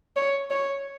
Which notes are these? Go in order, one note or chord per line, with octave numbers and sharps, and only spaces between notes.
C#5
C#5